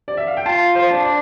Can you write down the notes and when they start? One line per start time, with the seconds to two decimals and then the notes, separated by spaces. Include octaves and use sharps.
0.08 D5
0.17 E5
0.27 F5
0.37 G5
0.46 F4 A5
0.75 C5
0.90 D4
1.05 D5